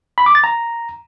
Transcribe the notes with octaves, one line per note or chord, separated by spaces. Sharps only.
B5
D6
A6
A#5